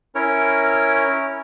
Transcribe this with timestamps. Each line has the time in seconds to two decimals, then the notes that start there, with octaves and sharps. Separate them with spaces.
0.15 C#4 E4 A#4 C#5